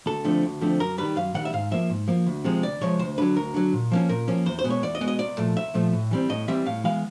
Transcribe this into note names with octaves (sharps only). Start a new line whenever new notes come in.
D2 A4
D3 F3 A3 C4
D2
D3 F3 A3 C4
F#2 A#4
D#3 G3 B4
F#2 F5
D#3 G3 F#5
E5
G#2 F5
F3 A#3 E5
G#2
F3 A#3
D2
C3 F3 G#3
D2 D5
C3 F3 G#3 C#5
D2 C5
D3 F#3 B4
D2 A#4
D3 F#3
A#2
F3 A#3 C#4
A#2 A#4
F3 A#3 C#4
E2 C5
C5
B2 G#3 B3
C#5
E2 D5
D#5
B2 G#3 B3
D#5
C2 D5
A#2 F3 A3
C2 E5
A#2 F3 A3
A2
E3 G3 C4
A2 D#5
E3 G3 C4 E5
A2 F5
E3 G#3 B3 F5